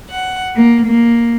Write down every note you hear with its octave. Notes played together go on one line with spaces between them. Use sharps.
F#5
A#3
A#3